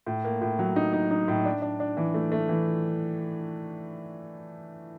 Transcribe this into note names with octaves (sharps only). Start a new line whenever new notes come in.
A2
A#3
A2
F#3
D#4
D#4
D#4
A2
D4
D4
D4
E3
A3
A3
E3